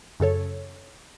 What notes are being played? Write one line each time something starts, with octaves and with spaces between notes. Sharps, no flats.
F#2 C#3 A4 C#5